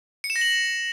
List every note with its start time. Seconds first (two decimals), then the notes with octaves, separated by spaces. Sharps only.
0.24 C#7
0.30 E7
0.36 A#6
0.41 F#7